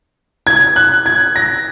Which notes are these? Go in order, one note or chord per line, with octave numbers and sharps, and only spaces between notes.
G#6
F#6
G#6
A#6